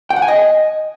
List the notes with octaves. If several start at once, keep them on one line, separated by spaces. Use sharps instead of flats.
G5
F#5
G#5
D#5